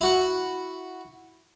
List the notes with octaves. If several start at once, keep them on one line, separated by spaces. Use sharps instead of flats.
E4 F#4 F#5